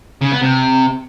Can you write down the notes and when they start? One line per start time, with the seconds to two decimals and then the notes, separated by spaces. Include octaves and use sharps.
0.22 C#3
0.31 B3
0.41 C3